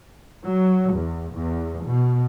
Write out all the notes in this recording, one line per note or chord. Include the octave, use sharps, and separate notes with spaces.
F#3
E2
E2
B2